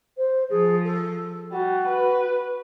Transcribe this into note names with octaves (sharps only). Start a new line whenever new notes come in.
C5
F3 G#4
A4
G3 F#4
B4